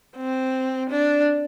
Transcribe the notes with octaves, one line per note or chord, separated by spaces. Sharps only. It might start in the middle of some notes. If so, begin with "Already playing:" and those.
C4
D4